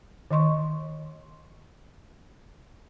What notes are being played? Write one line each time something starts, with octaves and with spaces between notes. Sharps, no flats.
D#3 D#5 C6 C#6